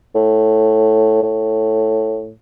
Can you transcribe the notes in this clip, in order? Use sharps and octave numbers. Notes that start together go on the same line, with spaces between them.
A2
A2